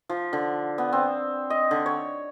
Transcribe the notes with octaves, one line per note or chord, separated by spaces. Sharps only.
F3
D3
B3
C4
D#5
D3
C#5